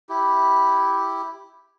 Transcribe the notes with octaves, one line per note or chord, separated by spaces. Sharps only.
E4 G4